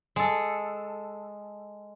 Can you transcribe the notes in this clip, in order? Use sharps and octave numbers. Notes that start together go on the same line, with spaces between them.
G#3 A4